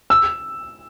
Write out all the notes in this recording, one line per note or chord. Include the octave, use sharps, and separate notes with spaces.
E6